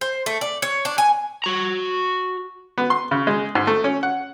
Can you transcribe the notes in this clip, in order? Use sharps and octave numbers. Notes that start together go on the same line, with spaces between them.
C5
A3
D5
C#5
D4
G#5
F#4 A#5
B3
C6
C#3
G#3
G#2
A3
C#4
F#5